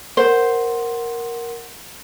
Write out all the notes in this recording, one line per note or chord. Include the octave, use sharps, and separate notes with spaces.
A#4 C5 F#5 C6